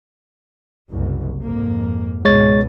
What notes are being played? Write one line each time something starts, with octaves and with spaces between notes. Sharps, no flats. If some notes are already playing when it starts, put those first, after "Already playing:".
F#1 C2
F2 G#2 A#3
C#2 G#2 B2 G#3 C#5 A6